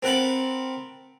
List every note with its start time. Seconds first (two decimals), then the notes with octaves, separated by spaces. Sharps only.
0.03 C4 A#4 F#5 A5 B5